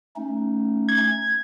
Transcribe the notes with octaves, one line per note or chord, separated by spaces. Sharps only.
A3 C#4 D#4
G#6